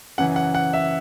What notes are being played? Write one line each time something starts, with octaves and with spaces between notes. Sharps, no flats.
F#2 C#3 E3 F#5
F#5
F#5
E5